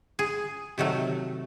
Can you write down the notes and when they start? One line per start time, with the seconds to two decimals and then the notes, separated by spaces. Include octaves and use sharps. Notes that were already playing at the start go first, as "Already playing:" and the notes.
0.19 G#4
0.78 C3 D#3 F#3 A3